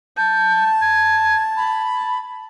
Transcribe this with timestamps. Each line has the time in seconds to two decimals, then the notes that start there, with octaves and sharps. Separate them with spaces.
0.17 A5 G6
0.81 G#6
1.57 B5